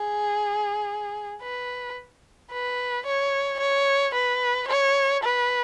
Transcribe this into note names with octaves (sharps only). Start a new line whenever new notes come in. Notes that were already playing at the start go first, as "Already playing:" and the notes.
Already playing: G#4
B4
B4
C#5
C#5
B4
C#5
B4